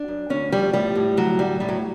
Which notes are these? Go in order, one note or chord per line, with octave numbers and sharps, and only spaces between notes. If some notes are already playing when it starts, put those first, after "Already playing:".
Already playing: D4
F#2
D2 C#4
F3 G3
A2 G3
A2
D2 F#3
D2 G3
A2 G3
F#3